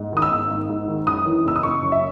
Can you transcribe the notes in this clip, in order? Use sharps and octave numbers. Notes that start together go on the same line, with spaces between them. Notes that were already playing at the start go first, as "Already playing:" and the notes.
Already playing: G#2
D#3 D#6
E6
G#1
G#1
G#2
D#3
F#2 D#6
E3
F#1 E6
D#6
F#1 C#6
F#2
E5